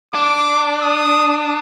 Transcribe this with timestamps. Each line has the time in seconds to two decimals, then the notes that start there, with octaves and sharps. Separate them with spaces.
0.14 D4 D6
0.82 D#6